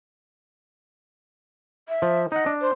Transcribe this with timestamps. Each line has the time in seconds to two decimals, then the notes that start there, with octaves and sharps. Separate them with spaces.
1.89 E5
2.02 F3
2.32 D#4 D#5 F#5
2.46 D4
2.61 C5